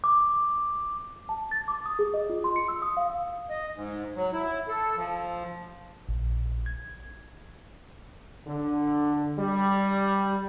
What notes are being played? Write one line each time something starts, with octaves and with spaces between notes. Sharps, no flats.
D6
A5
A6
D6
D#6
G#4
D#5
F4
C6
C#7
E6
D#6
F5
D#5
G#2
F#3
E4
A4
F3
A#1
G#6
D3
G3